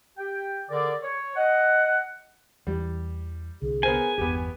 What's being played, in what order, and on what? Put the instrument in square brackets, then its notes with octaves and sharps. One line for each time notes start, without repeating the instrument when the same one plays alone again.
[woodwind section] G4 G5
D3 G#4 A#4 D5
C#5
D#5 F#5
[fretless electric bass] E2 E3 [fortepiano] G3
[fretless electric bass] C2 D3 [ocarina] G#4
[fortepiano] B3 A#4 C5 [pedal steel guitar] G#5
[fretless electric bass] G1 E2 [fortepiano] B3 G4